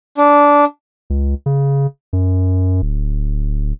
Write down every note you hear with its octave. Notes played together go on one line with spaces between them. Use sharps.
D4
C#2
C#3
F#2
D1